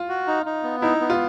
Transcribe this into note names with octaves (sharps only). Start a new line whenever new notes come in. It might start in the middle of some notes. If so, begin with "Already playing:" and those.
Already playing: F4
F#4
D#4
D#4
B3
D#4 E4
B3
F4